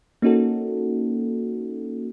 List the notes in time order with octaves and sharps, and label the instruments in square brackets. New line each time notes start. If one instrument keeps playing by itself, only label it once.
[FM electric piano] A#3 C#4 D#4 F#4 A4